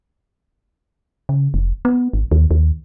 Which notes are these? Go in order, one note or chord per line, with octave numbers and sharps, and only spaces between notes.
C#3
F1
B3
G#1
D#2
D#2